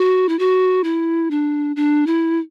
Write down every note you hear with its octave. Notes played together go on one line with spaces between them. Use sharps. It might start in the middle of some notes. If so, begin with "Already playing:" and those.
Already playing: F#4
E4
F#4
E4
D4
D4
E4